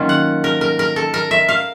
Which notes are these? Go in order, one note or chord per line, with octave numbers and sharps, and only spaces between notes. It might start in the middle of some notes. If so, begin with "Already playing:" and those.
Already playing: D#3 F#3 A#3 C#4 F4
F#5
A#4
A#4
A#4
A4
A#4
E5
F5